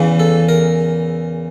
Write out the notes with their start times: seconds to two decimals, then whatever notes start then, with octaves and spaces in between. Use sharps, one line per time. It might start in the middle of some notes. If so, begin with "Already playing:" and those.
Already playing: E2 C#3 E3
0.20 A4
0.49 A#4